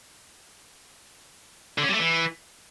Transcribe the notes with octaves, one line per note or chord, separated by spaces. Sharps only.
D3
C#4
G3
A3
E3